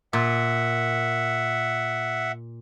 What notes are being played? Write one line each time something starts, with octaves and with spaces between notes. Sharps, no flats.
A#2 E5 F#5